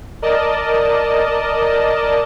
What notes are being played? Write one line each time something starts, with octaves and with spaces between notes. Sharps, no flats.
A#4 D5 D#5 A5